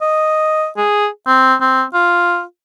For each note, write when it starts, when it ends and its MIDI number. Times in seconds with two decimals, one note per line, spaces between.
0.02 0.67 75
0.77 1.08 68
1.27 1.54 60
1.61 1.84 60
1.94 2.42 65